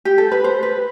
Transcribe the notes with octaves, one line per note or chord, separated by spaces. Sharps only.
G4
A4
B4
C5
B4